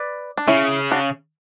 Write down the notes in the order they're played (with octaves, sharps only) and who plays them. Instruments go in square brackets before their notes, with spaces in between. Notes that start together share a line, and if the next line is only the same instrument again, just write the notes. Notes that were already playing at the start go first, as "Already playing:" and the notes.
Already playing: [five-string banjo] B4 D5
D4
[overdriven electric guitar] C#3 [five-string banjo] C#4 E4
[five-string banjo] D4 F#4